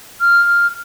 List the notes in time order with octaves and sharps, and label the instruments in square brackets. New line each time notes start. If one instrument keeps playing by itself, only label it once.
[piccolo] F6